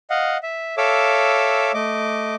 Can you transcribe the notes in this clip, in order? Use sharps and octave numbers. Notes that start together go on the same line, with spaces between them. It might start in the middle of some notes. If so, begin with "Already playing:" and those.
D#5 F5 F#5
E5
A4 C#5 E5 F5 D6 E6
A3 D#5 D6